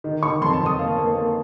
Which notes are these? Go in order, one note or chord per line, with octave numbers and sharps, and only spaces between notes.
D#3
D#3 C#6
F2 C6
A5
F2
D#6
A#3 F5
A#3
A#3